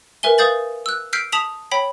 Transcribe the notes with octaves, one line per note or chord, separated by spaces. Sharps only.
A#4 B4 E5 G#5 G7
B4 F5 D#6 G6 A6 F#7
E6 F#6
E6 F6 G6 B6 C7 D7
A5 D#6 B6 F7 F#7
C#5 G5 B5 B6